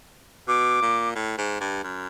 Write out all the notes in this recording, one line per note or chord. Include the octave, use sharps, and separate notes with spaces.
B2 D6
A#2
A2
G#2
G2
F#2